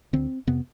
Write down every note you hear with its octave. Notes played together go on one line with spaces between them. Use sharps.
D2 D3 C4
F2 C3 B3